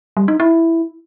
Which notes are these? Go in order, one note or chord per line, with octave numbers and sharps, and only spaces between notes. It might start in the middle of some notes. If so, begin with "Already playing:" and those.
G3
D#4
E4